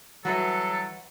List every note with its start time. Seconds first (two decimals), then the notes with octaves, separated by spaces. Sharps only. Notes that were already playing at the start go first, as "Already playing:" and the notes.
0.25 E3 F#3 G3 F#4 A4 B4 E5